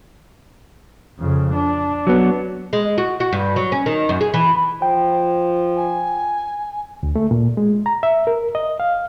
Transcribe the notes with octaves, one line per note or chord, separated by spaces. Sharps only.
F2 C#3
D4
F#3 B3
G#3
F#4
F#4
G2
F#3
C#4
D#3
F#2
G#4
E3
F3 G5
G#5
D2
A3
A#2
G#3
A#5
E5
A#4
D#5
F5